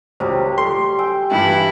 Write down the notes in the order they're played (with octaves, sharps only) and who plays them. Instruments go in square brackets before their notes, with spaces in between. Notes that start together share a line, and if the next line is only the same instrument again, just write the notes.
[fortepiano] C#2 [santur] F#3 G3 [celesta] C5
[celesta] A4 [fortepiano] C6
[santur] G5 [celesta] G#5 E6
[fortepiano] G2 E3 [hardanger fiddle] E4